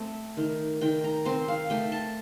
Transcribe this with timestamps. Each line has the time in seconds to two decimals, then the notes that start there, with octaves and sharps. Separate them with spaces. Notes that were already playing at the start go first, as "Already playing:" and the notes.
Already playing: A3 C4
0.37 D#3
0.81 D#3 G5
1.04 A#5
1.25 C4 C6
1.48 F5
1.70 A3 G5
1.92 A5